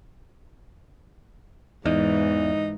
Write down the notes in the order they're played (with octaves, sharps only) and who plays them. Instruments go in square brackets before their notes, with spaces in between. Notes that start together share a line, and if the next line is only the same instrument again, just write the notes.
[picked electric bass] E2 [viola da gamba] G#2 E3 [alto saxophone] D#4